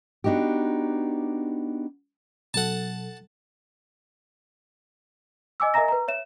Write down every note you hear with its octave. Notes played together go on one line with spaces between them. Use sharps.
B3 D4 D#4 F#4 G4
B2 F#3 A4 F#5 A5
D#5 G#5 D6 E6
A#4 D#5 E5 G#5 A#5 A#6
B4 A#5
C#5 E5 E7